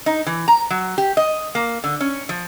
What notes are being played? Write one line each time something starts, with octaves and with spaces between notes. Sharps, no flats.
D#4
E3
A#5
F#3
G4
D#5
A#3
D3
C#4
F3